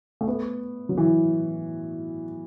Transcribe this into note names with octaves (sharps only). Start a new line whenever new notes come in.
A3
B3
F#3
E3